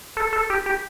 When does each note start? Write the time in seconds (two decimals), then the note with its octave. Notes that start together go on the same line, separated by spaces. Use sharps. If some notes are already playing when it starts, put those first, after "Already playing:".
0.17 A4
0.33 A4
0.50 G4
0.66 G4